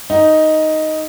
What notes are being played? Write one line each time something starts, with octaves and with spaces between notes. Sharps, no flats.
D#4